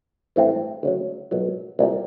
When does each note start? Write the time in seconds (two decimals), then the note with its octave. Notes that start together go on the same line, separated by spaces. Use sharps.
0.36 A1 G2 E3 A3 C4
0.83 D2 C#3 F#3
1.31 B1 A#2 F#3
1.79 C2 A#2 G3